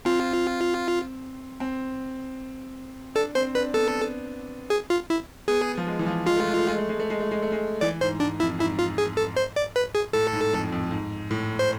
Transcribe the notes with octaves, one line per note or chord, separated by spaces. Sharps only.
C4 F4
C4
D4 A4
C4 C5
D4 B4
B3 A4
G#4
F4
E4
B3 G#4
F3
G#3
E3
F3
G#3 F4
A3
G#3
A3
G#3
A3
G#3
A3
G#3
A3
G#3
A3
G#3
E3 D5
G#2 C5
G#2 D4
F2 E4
G#2 E4
F4
G#4
A4
C5
D5
B4
G#4
A2 A4
G#2
F2
F2
G#2
A2
C5